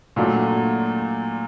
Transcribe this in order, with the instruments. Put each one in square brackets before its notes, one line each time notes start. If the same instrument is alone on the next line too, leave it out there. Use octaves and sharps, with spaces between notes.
[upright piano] A#2 F#3 A3 D4 F4